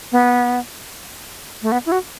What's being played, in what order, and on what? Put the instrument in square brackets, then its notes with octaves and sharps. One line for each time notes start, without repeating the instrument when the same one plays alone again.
[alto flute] B3
A3
B3
E4
F#4